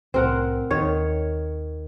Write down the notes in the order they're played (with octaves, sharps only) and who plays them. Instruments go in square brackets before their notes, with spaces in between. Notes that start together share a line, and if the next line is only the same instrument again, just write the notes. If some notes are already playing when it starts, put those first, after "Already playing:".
[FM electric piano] C2 A2 [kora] C4 A#4 F#5
[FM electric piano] D#2 [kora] D#3 C#5